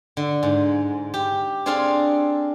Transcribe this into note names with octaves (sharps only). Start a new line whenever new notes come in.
D3
G#2
G4
C4 D4 G#4 A4 F5 C6